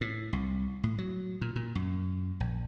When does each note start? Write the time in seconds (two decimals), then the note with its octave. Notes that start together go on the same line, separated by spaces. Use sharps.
0.01 A2
0.33 C2
0.83 A2
0.98 F#3
1.41 A#2
1.56 A#2
1.75 F#2
2.40 A#1